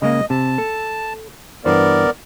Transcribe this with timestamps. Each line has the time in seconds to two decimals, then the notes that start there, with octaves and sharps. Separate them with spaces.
0.02 C#3 G#3 A#3 D#5
0.30 C3 A5
0.58 A4
1.65 G2 E3 B3 A#4 C5 D5